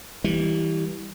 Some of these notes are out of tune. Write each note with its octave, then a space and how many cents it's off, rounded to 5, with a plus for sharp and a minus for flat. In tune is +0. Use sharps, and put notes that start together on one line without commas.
E3 -20 G3 +0